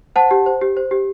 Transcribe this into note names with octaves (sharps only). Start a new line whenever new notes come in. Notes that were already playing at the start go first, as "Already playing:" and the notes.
C5 F#5 A5
G4
C5
G4
C5
G4